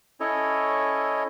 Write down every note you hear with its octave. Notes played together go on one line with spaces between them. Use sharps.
C#4 E4 A4 C#5 D#5